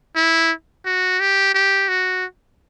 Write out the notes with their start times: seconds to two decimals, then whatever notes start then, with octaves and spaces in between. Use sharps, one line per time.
0.16 E4
0.85 F#4
1.20 G4
1.54 G4
1.89 F#4